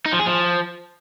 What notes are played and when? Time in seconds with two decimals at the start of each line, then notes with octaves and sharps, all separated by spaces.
0.06 D#4
0.12 F3
0.19 G#4
0.26 F3